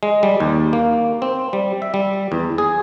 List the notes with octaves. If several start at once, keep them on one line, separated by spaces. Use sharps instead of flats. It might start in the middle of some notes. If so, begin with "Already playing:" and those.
G#3
G3
D#2
A#3
C4
G3
E5
G3
E2
G#4